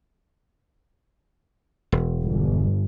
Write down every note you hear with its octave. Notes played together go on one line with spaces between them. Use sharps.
E1
G1